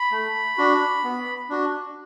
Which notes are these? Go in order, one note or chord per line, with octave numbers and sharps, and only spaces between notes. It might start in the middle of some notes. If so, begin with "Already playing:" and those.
Already playing: B5
A3
D4 F#4
B3
D4 F#4